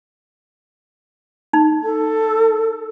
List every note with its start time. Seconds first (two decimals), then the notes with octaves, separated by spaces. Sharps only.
1.53 D#4
1.83 A4